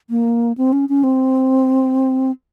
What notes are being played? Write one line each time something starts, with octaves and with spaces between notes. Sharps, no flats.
A#3
C4
C#4
C#4
C4